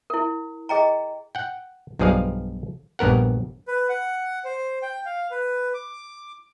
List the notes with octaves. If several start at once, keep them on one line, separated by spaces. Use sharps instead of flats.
E4 A#4
G#4 D#5 G5 A#5
F#5 G5
B1 G2 F3 G#4 D5 F5
A#1 G2 B3 A#4 F#5
B4
F#5
C5
G5
F5
B4
D6